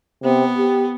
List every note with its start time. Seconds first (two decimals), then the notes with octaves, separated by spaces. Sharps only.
0.24 C3 B3
0.58 G4